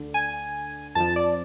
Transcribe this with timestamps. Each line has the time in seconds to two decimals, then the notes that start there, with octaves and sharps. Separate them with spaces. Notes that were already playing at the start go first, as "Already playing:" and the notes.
Already playing: D2 D3
0.14 G#5
0.95 F2 F3 A5
1.16 D5